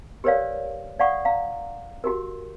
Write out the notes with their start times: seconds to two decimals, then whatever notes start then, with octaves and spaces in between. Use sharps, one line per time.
0.24 G4 A#4 B4 C#5 D5 F5
0.99 D5 F5 F#5 C#6 D#6
1.25 F5 A#5
2.04 F#4 G4 A#4